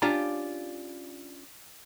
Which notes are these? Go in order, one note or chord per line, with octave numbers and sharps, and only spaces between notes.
C#4 D4 F4 G4 F5 A#5